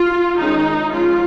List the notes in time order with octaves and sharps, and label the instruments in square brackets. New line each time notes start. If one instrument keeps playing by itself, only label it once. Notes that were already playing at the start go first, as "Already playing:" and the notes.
Already playing: [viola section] F4
D#3 G#3 C#4 D#4
F3 G#3 C#4 F4